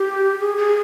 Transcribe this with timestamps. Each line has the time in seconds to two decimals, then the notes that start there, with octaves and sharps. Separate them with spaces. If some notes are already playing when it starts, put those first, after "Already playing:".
Already playing: G4
0.40 G#4
0.57 G#4